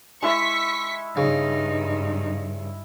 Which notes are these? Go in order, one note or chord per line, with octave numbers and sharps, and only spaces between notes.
G#3 E4 E5 C#6 B6
G2 C#3 D#4